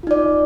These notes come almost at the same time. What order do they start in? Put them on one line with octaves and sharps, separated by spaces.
F4 D#4 D5